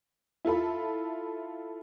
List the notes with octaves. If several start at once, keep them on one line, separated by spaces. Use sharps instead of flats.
E4 F4 A4 B5